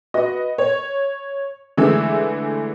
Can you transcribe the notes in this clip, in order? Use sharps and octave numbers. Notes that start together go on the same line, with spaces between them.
F#4 B4 D#5
C#5
D3 E3 G#3 A3 G#4 E6